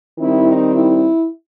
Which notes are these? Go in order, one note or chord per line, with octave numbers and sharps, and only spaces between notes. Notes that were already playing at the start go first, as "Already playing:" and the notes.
D#3 G3 C4 E4
D#4
E4